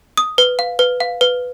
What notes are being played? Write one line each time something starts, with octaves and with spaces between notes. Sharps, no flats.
D#6
B4
F5
B4
F5
B4